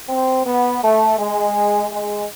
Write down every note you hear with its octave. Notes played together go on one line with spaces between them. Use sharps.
C4
B3
A3
G#3
G#3